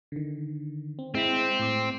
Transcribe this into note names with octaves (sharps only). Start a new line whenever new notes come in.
D3 D#3
C4
G#3 C4 E4 B6
A2 D6